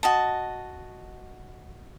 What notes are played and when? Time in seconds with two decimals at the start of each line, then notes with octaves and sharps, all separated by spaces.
0.03 F#4 D#5 A5